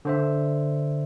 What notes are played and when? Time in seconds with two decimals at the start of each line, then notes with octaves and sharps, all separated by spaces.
0.05 D3 C5 E5